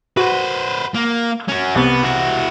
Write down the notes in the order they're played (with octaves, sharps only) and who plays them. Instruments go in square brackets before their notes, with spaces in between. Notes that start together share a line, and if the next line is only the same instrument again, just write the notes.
[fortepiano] F#4 [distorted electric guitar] B4 C5
[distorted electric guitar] A#3
C#4 F#4
[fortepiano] C2 [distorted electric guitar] B3
[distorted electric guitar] E4 F#4